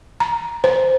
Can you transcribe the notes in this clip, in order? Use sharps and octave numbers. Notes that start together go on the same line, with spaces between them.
A#5
C5